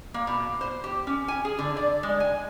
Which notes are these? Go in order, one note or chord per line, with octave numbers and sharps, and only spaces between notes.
A#3
B2
C5
G4
C#4
G#5
G#4
D3
D5
G#3
G#5